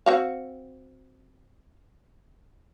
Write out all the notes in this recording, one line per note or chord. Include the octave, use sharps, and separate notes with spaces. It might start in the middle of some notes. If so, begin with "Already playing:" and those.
C4 F#4 F5